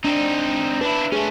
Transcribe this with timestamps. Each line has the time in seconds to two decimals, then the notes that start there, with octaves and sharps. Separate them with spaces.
0.05 C4 D4 D#4
0.81 D4 E4 B4
1.12 A3 C#4 G#4